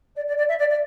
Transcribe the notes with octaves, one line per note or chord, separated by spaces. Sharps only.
D5
D5
D5
E5
D5
D5